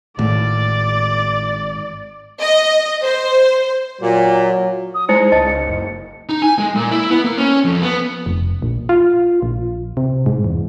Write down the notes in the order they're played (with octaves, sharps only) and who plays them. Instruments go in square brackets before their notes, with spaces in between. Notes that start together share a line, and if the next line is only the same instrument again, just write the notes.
[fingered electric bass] G#1 [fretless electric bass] A2 [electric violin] D5
[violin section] D#5
C5
[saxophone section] A#2 [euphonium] F#3
[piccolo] D#6
[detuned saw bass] G#3 [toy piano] D#4 E4 C5 [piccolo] C#7
[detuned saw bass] C#2 [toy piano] D#5 A5
[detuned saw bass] F#1
[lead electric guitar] D#4
G#5
G#3
A#2
E4
B3
A#3
C#4
F2
B3
[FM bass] F1
A#1
F4
A#1
C3
G#2
E2